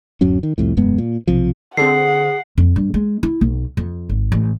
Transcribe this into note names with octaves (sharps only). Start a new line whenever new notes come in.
D1 F#2 F#3 C#4
D#3
C2 F2 A2
E1 F#2 G#3 B3
A#2
B1 C3 F3
D3 C4 G#4 F#5 C7
F2
G2
G#3
E4
B1
F2
G#1
A1